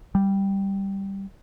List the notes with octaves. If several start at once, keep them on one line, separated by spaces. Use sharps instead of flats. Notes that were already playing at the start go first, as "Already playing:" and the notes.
G3